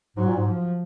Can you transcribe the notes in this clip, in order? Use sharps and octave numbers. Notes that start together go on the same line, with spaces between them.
G#2 F#3
A#2
G#2
F3